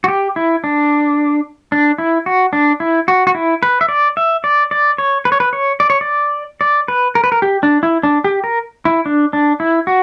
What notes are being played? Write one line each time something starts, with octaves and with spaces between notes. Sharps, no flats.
F#4
G4
E4
D4
D4
E4
F#4
D4
E4
F#4
F#4
E4
B4
E5
D5
E5
D5
D5
C#5
B4
C#5
B4
C#5
D5
C#5
D5
D5
B4
A#4
B4
A#4
G4
D4
E4
D4
G4
A#4
E4
D4
D4
E4
F#4